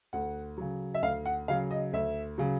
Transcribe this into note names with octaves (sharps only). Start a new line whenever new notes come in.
D2 F#5
C#3 F#3
E5
D2 F5
F#5
C#3 F#3 F5
D#5
D2 E5
C#3 F#3